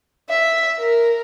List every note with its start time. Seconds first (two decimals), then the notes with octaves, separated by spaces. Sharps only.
0.29 E5
0.79 A#4